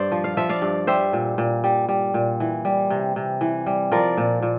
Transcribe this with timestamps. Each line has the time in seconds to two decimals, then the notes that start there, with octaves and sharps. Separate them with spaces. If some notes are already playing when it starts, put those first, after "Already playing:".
Already playing: G2 C5 D5
0.12 F3
0.24 F5
0.37 F3 E5
0.49 D5 F5
0.62 G2
0.87 G3 C5 E5
1.13 A#2
1.38 A#2
1.64 G3
1.89 G3
2.14 A#2
2.40 E3
2.65 G3
2.90 C3
3.16 C3
3.41 E3
3.66 G3
3.92 F3 A#4 D5
4.18 A#2
4.42 A#2